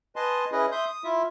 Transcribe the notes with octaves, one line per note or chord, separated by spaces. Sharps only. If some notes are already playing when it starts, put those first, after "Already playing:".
B4 D#5 G#5 A5 C6
C#4 E4 G#4 B4 D#5
E5 C6 D#6 G6
D#6
E4 F4 E5